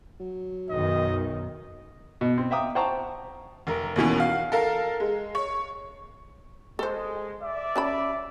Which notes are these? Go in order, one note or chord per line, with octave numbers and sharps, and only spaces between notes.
F#3
B1 F#2 D#3 D#5
B2
C4
E5 F5 G5 A#5 D6 D#6
C5 F#5 G5 A5 A#5 C#6
F1 A#4
D#2 B2 E3 C#4
F#4 F5
A4 A#4 F5
G#3
C#5
G#3 A4 C5
D5 E5
C#4 A5 B5